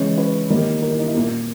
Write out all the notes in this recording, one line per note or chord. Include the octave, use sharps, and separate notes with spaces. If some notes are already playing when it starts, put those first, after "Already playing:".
Already playing: C#3 E3 G#3 C#5
B4
D#3 G3 A#3 A#4
A#4
E4
D#4
E4
A#2 A#3 A#4